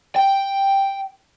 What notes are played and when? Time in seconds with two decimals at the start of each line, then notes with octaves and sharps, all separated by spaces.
0.16 G5